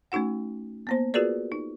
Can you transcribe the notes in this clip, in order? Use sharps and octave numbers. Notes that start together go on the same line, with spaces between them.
A3 C#4 D#4 F#4 F#5
A#3 B3 C5
F4 F#4 G#4 A#4 B4 D5
D#4